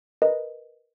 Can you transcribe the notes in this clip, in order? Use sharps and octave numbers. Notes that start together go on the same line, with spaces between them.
A#4 B4 D#5